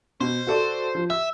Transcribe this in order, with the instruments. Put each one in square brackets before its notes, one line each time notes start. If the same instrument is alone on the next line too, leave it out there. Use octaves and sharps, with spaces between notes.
[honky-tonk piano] B2 [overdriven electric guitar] C5
[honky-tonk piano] F#4 A4 D5
F3
[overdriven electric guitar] E5 [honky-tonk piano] E6